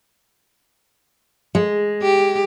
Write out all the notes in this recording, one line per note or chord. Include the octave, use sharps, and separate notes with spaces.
G#3
G4